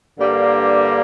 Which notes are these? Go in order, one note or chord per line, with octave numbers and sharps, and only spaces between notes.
G2 D3 G3 A#3